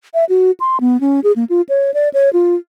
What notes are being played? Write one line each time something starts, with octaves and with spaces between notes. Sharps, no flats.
E5
F#4
C6
B3
C#4
G#4
A#3
F4
C#5
D5
C#5
F4